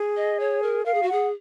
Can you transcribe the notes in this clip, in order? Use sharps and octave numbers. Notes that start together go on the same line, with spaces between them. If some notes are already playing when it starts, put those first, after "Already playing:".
Already playing: G#4
D#5
C#5
A#4
A#4 F5
G#4
F#4
G#4 F#5